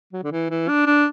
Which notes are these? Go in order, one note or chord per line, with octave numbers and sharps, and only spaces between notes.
F#3
D3
E3
E3
D4
D4